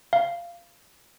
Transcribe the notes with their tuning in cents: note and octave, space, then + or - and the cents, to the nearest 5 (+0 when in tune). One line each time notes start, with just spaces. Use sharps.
F5 -15